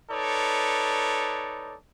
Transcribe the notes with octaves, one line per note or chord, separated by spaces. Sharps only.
D#4 A4 B4 C#5 D5